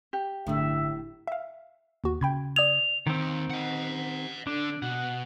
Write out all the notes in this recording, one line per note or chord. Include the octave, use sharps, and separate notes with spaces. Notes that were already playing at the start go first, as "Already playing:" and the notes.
G4
G1 F#2 A2 D3 E5
E5 F5
D#2 F#4
C#3 G5 B5 G#6
D5 D#6 G#6 F7
D#2 D#3 C4
D#5 F#5
D3 D4
B2 F#5